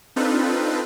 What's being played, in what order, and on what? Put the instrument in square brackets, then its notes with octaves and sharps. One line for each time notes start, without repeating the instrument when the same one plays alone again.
[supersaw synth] C4 D4 D#4 F4 A4 B4